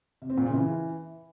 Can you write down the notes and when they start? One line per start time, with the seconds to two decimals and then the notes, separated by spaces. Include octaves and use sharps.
0.22 C3
0.30 C4
0.38 A#2
0.46 C#3
0.54 E3